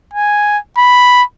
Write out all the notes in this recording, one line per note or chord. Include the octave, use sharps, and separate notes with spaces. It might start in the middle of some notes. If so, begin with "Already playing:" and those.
G#5
B5